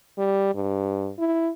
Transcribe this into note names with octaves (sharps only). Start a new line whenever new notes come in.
G3
G2
E4